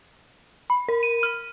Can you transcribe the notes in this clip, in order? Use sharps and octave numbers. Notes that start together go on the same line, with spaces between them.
B5
A#4
D#7
F6